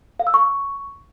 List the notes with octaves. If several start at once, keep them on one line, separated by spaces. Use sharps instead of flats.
F5
E6
C#6